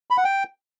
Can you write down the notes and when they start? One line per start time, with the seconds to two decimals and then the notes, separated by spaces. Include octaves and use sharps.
0.10 B5
0.18 F#5
0.25 G5